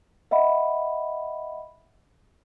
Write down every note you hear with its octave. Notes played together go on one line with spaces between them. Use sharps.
D#5 E5 F#5 B5